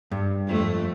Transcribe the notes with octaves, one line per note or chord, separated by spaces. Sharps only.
G2
F2 A3